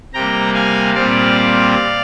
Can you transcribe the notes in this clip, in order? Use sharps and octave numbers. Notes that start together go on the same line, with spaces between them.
C3 G3 A#3 G5 A#5
F5 G#5
A#2 G3 C4 D5 F5